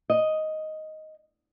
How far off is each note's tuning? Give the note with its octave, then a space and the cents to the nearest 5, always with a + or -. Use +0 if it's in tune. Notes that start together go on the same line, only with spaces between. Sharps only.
D#5 +5